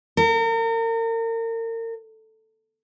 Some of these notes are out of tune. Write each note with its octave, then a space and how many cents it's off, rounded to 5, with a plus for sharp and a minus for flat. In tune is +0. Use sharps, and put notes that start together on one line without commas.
A#4 -35